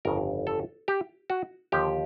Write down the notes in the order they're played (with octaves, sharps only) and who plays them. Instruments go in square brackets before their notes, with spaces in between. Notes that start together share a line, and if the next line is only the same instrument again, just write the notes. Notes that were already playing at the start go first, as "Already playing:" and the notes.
[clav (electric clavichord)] G1 F2 C#3 A#4
A4
G4
F#4
D#2 D3 F3 G4